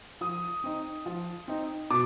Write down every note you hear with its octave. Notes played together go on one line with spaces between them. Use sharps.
F3 D#6
C4 D#4
F3
C4 D#4
B2 D6